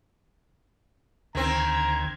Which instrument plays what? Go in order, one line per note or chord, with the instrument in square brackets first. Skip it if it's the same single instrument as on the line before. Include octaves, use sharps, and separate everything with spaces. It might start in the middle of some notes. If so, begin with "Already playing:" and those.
[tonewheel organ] D2 G#6 [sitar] D#3 C4 [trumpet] A#5